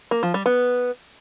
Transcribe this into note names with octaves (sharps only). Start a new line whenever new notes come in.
A#3
F3
G3
B3